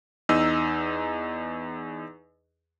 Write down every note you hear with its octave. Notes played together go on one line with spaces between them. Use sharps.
E2 D#4 D#5 E6